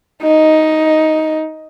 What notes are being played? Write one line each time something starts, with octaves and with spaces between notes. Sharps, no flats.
D#4